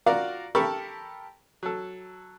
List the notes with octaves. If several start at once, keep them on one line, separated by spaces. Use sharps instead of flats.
F4 F#4 A#4 D5 F5
G4 A4 A#4 A5 B5 C#6
F#3 A4